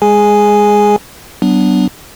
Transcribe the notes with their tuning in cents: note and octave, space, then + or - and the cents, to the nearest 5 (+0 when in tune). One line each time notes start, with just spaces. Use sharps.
G#3 -20 G#4 +0 G#5 +0
F#3 +45 B3 +0 D4 +0